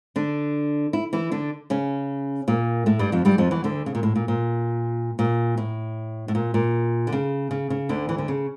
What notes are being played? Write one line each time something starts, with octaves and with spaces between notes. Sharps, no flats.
D3 D4
E4
E3 E4
D3 D4
C#3 C#4
A#2 A#3
A2 A3
G2 G3
F2 F3
G2 G3
F2 F3
E2 E3
D2 D3
C#3
A#2
A2
A#2
A#2
A#2
A2
A2
A#2
A#2
D3
C#3
C#3
C#3
D2 D3
E3
D3
C#3